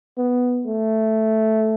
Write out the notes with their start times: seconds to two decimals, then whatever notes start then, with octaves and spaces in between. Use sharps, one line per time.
0.18 B3
0.66 A3